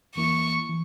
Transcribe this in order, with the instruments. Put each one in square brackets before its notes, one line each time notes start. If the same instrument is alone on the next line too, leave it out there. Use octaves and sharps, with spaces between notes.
[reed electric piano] E2 E3 A#3 E4 [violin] C#6
[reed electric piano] E3